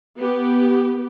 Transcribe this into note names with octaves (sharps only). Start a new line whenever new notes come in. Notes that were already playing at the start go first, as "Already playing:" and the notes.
B3 G4